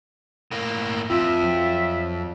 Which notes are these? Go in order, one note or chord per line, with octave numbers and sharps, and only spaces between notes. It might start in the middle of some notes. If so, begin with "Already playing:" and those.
A2 A#3
F2 F4 E5
F#3